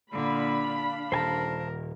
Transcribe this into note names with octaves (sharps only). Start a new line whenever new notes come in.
A#2 D3 D4 F5 B5
D#1 A#4 C5 G#5 A5